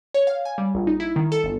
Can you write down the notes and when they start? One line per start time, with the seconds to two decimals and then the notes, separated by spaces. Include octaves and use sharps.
0.14 C#5
0.27 F5
0.45 G#5
0.58 G3
0.74 A#1
0.87 D#4
1.00 E4
1.16 D#3
1.32 A4
1.44 G1